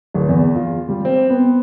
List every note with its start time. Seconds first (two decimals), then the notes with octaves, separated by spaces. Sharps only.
0.14 D1
0.29 E2
0.55 F4
0.89 G3
1.05 C4
1.30 B3